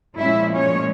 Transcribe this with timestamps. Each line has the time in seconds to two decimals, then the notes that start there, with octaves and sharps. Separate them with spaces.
0.18 A#2 F3 G#3 C#4 E4 E5
0.52 C#4 C#5